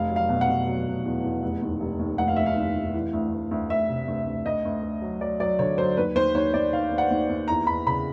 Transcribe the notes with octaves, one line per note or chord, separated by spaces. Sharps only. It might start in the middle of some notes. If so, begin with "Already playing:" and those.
Already playing: F1 F5
F#3
F5
B2
F#5
B2
F#3
F1
E2
E2
F1
D#2
F1
D#2
F1 F#5
F5
F1 E5
F5
D#2
F1
E3
D2
D2
D2
D2 E5
C3
D2
D2
D2 D#5
D2
D2
F#3
F#3 D5
F#3 D5
D3 C#5
F#3 C5
D#2 B4
D#2 C5
D#2 C#5
D#2 D5
D#3 F5
D#2
F#5
D#2
D#2
E2 A#5
E2 B5
C#3 B5